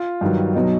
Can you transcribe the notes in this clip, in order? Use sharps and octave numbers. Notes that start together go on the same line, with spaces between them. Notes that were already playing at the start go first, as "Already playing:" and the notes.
Already playing: F4
G2 D#3 F#3
B2 F#3 D#4